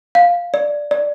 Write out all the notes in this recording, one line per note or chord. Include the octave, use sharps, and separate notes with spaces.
F5
D5
D5